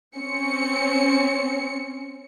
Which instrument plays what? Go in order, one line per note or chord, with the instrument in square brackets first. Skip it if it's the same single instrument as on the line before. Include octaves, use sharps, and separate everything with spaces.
[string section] C4 C#4 C#7